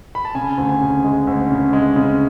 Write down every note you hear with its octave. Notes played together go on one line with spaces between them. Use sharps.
B5
A5
C#3 G#5
D2
G#5
C#3
G#3
D2
C#3
G#3
C#3